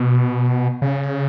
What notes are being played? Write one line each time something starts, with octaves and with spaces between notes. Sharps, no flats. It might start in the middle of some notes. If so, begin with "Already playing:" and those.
Already playing: B2
C#3